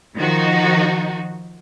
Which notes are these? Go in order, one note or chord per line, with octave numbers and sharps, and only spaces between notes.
D#3 F3 D#4 F#4